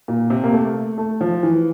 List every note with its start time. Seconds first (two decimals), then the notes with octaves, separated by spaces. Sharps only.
0.08 A#2
0.30 C3
0.44 A#3
0.53 A3
0.98 A3
1.21 F3
1.43 E3